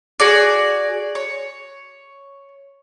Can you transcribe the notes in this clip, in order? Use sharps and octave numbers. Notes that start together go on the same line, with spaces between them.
F#4 G#4 D5
C#5